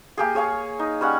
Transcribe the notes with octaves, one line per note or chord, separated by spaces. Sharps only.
A#3 G4 G#4
G#4 C#5 F5 C#6
D#4
G3 C#4 F#5